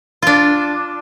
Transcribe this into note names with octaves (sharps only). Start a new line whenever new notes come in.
D4 F4